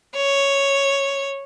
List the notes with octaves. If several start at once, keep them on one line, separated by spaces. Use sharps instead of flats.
C#5